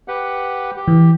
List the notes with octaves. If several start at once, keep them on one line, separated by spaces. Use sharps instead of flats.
G4 B4 F#5
G4
E3